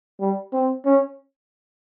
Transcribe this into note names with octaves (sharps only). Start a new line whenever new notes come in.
G3
C4
C#4